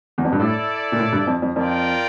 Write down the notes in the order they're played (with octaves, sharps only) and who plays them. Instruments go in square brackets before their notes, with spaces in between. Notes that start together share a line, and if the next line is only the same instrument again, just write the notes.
[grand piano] E2
F2
G2
[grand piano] A2 [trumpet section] E4 A4 D5
[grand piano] A#2
A2
G2
F2
F2
[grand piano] F2 [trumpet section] F4 A#4 D5 G5